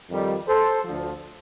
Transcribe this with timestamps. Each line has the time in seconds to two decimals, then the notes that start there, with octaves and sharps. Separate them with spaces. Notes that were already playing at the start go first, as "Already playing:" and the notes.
0.09 F2 D#3 G3
0.47 A4 C5
0.84 D2 D3 F3